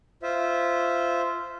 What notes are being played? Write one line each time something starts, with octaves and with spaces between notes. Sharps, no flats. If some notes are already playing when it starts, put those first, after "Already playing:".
F4 C5 E5